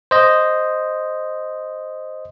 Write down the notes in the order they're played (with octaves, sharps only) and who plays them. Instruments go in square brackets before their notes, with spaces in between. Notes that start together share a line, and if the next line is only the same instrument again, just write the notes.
[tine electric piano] C5 D#5